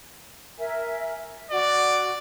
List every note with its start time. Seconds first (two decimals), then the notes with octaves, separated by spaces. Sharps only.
0.58 A#4 E5 G#5
1.51 F#4 D5